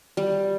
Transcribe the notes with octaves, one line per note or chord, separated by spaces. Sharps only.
G3